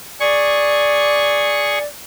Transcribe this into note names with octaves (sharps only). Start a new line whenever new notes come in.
G#4 D5 C#6